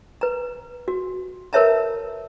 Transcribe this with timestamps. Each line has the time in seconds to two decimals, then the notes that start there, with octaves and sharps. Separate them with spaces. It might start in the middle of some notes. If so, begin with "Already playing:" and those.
0.21 B4 A#5
0.88 F#4
1.53 A#4 B4 C#5 E5 A5 A#5